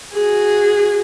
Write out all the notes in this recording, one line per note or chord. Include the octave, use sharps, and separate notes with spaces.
F#4 G#4